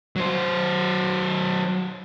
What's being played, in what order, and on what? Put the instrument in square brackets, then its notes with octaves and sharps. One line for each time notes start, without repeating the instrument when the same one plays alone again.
[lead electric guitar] F#3 C5